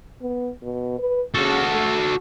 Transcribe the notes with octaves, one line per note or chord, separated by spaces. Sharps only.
B3
B2
B4
C#3 F#4 A4
A3